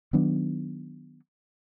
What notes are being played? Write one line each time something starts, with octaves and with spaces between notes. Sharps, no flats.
D#3 F#3 B3 D4